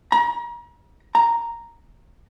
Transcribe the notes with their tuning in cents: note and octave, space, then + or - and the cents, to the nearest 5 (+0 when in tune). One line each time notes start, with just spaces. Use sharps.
A#5 +35
A#5 +0